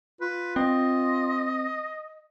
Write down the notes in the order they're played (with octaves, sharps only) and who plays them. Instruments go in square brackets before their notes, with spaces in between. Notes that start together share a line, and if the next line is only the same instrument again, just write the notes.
[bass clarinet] F4 [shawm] B4
[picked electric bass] C4 [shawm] D#5